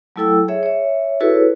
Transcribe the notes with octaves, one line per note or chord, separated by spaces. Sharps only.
F#3 A3 E4 A4 G5 E6
G#4 C#5 E5
C#5 E5
E4 F#4 G#4 A4 B4 C#5